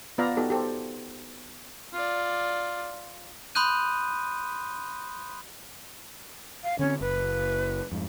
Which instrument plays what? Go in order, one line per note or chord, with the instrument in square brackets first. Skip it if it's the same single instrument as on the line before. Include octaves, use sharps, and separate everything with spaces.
[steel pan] B3 F4 D5 F5 A#5 B5
B3 D#4 F#4 G4 A4
G4 A4 C5
[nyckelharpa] F4 D5
[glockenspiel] B5 C6 D#6 F#6 G6 D#7
[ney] F5
[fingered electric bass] D3 C4 [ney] C#4
[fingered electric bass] F#1 [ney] B4
[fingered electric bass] F2 G#2